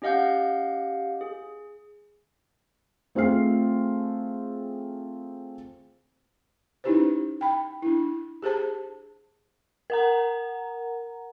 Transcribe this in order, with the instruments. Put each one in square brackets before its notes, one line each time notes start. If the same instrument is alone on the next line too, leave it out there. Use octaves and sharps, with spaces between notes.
[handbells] C#4 G4 D#5 F5 F#5 G6
G#4
[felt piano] A3 C4 F4 G#4 F6 C7
[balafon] C#4 D#4 E4 G4 B4 C5
G5 B5
D4 E4
G4 G#4 C5 A5
[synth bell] A#4 F#5 A#5